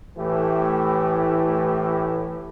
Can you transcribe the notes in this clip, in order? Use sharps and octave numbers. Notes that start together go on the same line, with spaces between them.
A2 E3 A3 E4 G4